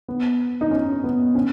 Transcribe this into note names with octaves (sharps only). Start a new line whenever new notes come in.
B3
D#4
C#4
B3
C#4